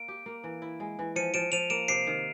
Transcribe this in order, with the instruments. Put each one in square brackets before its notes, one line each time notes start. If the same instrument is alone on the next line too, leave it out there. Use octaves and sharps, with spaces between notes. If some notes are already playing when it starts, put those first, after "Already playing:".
Already playing: [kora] A#3 [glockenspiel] D7
[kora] G4
A#3
E3
E4
G#3
E3
[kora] F3 [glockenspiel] C#7 D#7
[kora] F3 [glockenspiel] D7 E7
[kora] F3 [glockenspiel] D#7 F7
[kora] A#3 [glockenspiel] D7 E7
[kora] C3 [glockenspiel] C7 D7
[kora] D#3